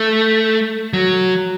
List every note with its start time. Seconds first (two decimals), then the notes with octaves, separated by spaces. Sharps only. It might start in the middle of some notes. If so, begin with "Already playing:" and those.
Already playing: A3
0.93 F#3